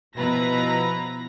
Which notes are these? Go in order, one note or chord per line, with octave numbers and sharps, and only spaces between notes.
B2 F3 E4 B4 A#5 A#6